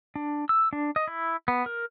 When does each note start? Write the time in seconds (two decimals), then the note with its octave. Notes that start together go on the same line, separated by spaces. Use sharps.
0.16 D4
0.49 E6
0.73 D4
0.96 D#5
1.08 E4
1.48 B3
1.66 A#4